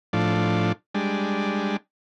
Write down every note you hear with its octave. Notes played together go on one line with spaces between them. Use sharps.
A2 F3 D4
G3 G#3 D4